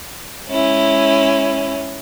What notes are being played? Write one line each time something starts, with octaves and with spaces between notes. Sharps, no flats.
G#3 C#4 E4